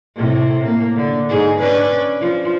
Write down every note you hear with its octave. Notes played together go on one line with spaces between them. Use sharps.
A2 C3
A#3
D3
G#2 G#4
C#4 D4 B4
F3